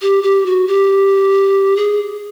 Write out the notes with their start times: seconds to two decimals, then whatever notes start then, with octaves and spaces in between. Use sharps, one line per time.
0.02 G4
0.23 G4
0.46 F#4
0.67 G4
1.76 G#4